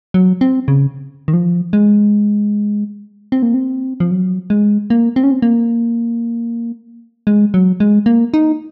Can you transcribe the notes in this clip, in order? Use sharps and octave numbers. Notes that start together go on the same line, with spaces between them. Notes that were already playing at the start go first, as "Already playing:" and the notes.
F#3
C4
C#3
D#3
F3
G#3
C4
A#3
C4
F3
F#3
G#3
A#3
C4
C#4
C4
A#3
G#3
F#3
G#3
A#3
D#4